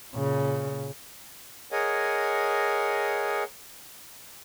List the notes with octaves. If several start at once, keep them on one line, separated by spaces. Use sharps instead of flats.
A#2 C#3
G#4 A#4 C#5 D#5 F#5 G#5